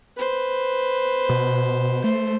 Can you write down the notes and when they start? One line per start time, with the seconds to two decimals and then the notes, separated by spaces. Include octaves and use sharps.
0.17 B4 C5
1.29 B2
2.04 A3 C5